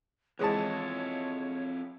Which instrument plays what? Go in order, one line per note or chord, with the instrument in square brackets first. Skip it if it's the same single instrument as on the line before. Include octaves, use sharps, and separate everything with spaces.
[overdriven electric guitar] F2 E4 [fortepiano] E3 G#3 A5 [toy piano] G#4 C5 [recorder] C#5